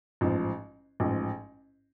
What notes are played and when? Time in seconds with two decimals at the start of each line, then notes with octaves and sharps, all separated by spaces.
0.21 A1 G#2 F3
1.00 A1 G#2 F3